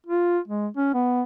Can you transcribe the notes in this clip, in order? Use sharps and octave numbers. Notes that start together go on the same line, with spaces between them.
F4
G#3
C#4
B3